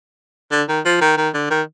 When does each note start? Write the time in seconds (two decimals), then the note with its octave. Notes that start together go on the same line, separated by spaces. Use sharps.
0.52 D3
0.69 D#3
0.85 F3
1.01 D#3
1.17 D#3
1.34 D3
1.50 D#3